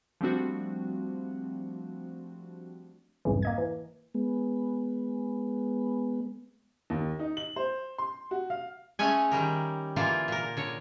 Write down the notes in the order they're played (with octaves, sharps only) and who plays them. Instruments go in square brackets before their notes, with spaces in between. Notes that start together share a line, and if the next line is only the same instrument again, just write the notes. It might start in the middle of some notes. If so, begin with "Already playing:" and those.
[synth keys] F3 G3 A3 C4 D4 F#4
[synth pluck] C2 F2 G#2 C#3 E3
A#3 D#5 G#6
E3
[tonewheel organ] G#3 B3
[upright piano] D#2
D#4
F#7
C5
C6
F#4
F5
[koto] G#3 A3 C#4 G#5
D#3 G3 A#4
D3 E3 A#3 F4 D5
A#2 A#4
D3 C#5